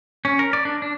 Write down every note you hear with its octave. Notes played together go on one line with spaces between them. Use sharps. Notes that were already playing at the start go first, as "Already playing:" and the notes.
C#4
A#4
D5
D4
D4